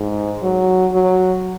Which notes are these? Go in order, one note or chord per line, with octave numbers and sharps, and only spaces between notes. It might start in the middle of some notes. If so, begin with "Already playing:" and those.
Already playing: G#2
F#3
F#3